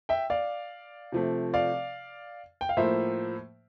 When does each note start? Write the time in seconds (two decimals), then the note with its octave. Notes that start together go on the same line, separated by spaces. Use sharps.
0.09 E5 G5
0.30 D5 F5
1.12 C3 F3 A3
1.54 D5 F5
2.61 G5
2.69 F5
2.77 A2 F3 A#3 C5 E5